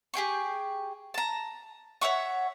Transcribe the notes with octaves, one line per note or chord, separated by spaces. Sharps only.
G4 G#4 G5 C#6
A5 A#5
C#5 E5 F#5 C#6